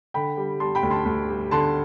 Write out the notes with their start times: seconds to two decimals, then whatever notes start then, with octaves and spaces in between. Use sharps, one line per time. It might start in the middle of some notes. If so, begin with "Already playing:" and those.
0.14 D3 G5 B5
0.37 G3
0.60 G3 A5 C6
0.75 G5 B5
0.83 D2
0.91 A5 C6
1.06 D2
1.29 G3
1.51 D3 A5 C6